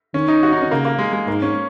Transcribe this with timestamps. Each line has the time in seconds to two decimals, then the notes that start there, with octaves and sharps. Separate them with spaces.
0.14 D#3 C#4
0.28 D#4
0.43 F#4
0.52 D#4
0.62 C#4
0.70 C#3 A#3
0.85 A#3
0.99 G#3
1.13 G#3
1.27 G#2 A#3
1.42 C#4